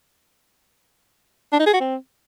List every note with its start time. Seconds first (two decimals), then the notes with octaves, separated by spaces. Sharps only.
1.53 D4
1.59 D#4
1.66 G#4
1.73 F#4
1.80 C4